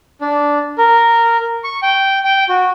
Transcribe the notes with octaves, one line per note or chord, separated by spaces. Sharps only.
D4
A#4
C#6
G5
G5
F#4